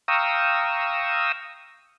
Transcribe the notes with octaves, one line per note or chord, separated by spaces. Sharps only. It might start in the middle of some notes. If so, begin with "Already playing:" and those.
F5 G5 A#5 C#6 D#6 E6